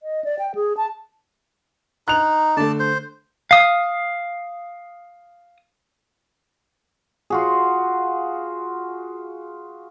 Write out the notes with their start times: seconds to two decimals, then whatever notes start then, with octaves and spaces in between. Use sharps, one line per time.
0.03 D#5
0.24 D5
0.39 G5
0.55 G#4
0.77 A5
2.08 D#4 F#6 F7
2.57 D3 A3 D5 A5
2.80 C5
3.51 F5 D#6
7.30 F4 F#4 G#4